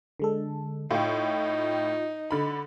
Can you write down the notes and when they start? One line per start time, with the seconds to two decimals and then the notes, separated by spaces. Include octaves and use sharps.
0.20 D3 G#3 A4
0.91 A2 D#4 F4 G5
2.31 D3 B5